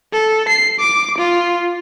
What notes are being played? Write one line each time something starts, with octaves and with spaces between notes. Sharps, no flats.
A4
C7
D6
F4